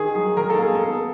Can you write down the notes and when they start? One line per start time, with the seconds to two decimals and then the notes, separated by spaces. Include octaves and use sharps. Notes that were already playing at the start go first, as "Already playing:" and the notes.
Already playing: D#3 G#4
0.15 F#3 G#4
0.37 D#3 A#4
0.50 A4
0.58 A#3 G#4
0.75 B3 A4